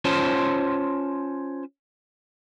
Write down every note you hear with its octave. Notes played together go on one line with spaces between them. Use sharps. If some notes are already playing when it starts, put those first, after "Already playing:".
C#4 F4 C5 C#5 A5 C6